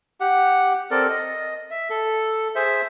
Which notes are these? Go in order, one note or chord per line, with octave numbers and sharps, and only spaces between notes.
G4 F#5
C4 A4 A#4 D5
D#5
E5
A4
G#4 C5 E5